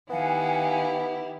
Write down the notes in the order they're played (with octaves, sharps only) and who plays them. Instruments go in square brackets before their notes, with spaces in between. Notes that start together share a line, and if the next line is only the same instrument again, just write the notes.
[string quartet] D#3 E4 G4 [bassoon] B3 [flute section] F5 F#5 G#5